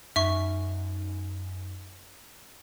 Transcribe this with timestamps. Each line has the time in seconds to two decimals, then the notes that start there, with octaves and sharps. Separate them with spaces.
0.16 F#2 D#4 E5 C#6